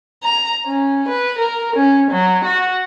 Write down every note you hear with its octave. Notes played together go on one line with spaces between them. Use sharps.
A#5
C#4
B4
A#4
C#4
F#3
F#4